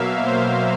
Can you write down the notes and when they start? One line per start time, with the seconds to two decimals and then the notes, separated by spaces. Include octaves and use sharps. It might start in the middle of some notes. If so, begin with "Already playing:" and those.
Already playing: B2 F#3 A#3 E5 F5
0.24 C5